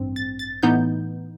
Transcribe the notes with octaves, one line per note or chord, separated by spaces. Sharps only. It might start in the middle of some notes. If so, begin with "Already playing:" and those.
Already playing: A1 G2 C4
A6
A6
A2 E3 B3 D#4 G6